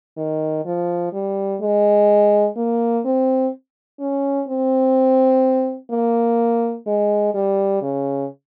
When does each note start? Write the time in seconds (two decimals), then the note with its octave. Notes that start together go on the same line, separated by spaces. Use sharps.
0.17 D#3
0.65 F3
1.12 G3
1.61 G#3
2.56 A#3
3.05 C4
3.99 C#4
4.48 C4
5.90 A#3
6.87 G#3
7.34 G3
7.82 C#3